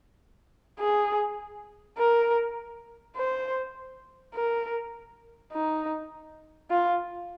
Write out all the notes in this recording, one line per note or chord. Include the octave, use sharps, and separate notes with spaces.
G#4
A#4
C5
A#4
D#4
F4